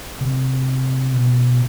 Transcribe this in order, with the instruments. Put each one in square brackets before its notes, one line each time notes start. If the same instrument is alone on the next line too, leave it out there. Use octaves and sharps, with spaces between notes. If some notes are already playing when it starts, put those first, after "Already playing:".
[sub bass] C3
B2